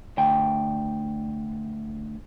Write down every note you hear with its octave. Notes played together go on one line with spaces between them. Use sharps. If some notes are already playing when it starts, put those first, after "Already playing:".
D2 G5